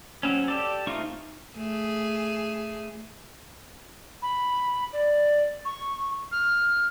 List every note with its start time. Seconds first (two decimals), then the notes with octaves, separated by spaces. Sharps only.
0.23 F#3 C4 C#4
0.48 G4 A4 D5
0.87 A3 C4 D#4 F4 C#6
1.55 A3 G#4
4.22 B5
4.93 D5
5.65 C#6
6.32 F6